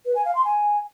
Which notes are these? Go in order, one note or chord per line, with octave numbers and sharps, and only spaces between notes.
B4
G#5
F5
C6
G#5